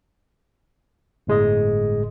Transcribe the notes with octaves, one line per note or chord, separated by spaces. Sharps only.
G1 A2 G#3 G#4 D#5